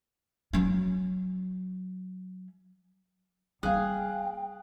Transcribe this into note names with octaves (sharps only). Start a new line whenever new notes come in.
F#3 C#4
G3 A#3 G#4 F5 G5 F#6